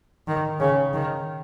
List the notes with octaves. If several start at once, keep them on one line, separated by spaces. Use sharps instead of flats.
D#3
C#3
D#3